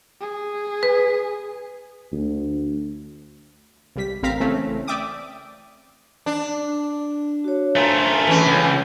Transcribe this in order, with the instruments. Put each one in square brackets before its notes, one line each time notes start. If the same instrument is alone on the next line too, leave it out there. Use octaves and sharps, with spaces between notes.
[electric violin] G#4
[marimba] B4
[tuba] D2
[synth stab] C2 G3 B6
A1 C4 A#4 F5 A#5 B6
C#3 E3 A3 C4 C#4
D5 E5 G5 D6 D#6
[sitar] D4
[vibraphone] F#4 C#5
[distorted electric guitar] A3 F4 [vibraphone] C5 G#5 A#5
[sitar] E3 G#3 C#4 [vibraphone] G#5
[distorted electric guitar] C#2